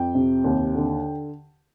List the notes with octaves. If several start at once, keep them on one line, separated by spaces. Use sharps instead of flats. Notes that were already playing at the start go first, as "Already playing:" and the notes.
Already playing: F2 G5
C3
D#2
D3